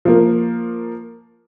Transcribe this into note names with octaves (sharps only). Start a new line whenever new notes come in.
F3 A#3